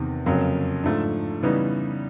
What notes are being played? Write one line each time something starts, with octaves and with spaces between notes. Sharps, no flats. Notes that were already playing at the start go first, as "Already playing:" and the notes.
Already playing: E2 C3 D#3
F2 C#3 F#3 A#3
G#2 F3 A3 D4
C#3 E3 G3 B3 D#4